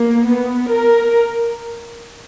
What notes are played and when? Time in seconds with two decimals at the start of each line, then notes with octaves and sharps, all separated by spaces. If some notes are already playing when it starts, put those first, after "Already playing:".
Already playing: A#3
0.26 B3
0.70 A#4